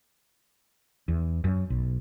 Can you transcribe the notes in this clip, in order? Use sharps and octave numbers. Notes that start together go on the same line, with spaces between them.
E2
F#2
B1